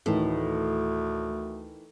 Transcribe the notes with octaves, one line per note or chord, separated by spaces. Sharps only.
D2 A2 D#3 E3 A3